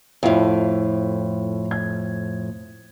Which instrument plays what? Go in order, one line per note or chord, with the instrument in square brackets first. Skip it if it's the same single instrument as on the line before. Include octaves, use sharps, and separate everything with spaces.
[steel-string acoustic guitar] F2 A2 [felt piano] E4 F4 D#5
[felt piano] G#6